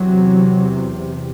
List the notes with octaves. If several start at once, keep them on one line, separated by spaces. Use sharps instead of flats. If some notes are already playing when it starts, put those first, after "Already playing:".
Already playing: E2 C3 F#3